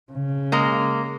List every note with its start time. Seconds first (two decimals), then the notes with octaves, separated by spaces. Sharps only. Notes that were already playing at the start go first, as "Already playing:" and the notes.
0.12 C#3
0.52 G#3 A#3